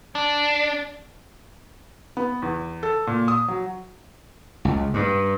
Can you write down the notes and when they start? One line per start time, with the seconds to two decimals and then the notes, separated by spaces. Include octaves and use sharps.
0.15 D4
2.17 B3
2.42 E2
2.83 A4
3.07 A#2
3.28 D#6
3.48 F#3
4.65 C#2
4.94 G2